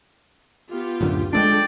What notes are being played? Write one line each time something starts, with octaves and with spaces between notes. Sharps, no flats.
B3 F4 G4
D1 F#2 D3
G#3 A3 D4 A4 D5 G5